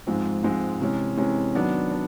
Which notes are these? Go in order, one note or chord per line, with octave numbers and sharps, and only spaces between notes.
G#2 F3 G#3 C4
G#2 F3 G#3 C4
C3 E3 G#3 C#4
C3 E3 G#3 C#4
D#3 F#3 B3 D4
D4